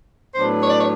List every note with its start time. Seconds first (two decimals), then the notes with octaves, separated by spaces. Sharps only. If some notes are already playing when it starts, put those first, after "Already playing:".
0.34 A2 F#3 B3 D4 C5
0.61 C#5
0.69 D5
0.77 C#5